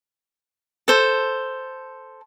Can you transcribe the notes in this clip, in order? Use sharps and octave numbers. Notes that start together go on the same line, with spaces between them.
A4 C5